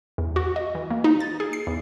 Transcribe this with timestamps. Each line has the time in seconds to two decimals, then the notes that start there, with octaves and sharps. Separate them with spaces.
0.18 E2
0.36 F#4
0.56 D#5
0.75 E3
0.90 A#3
1.04 D#4
1.20 A6
1.40 G#4
1.53 C7
1.67 E2